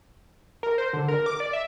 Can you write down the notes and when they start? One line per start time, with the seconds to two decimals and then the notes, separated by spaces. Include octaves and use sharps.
0.63 A#4
0.78 C5
0.93 D3
1.08 A#4
1.26 D6
1.40 D5
1.53 E5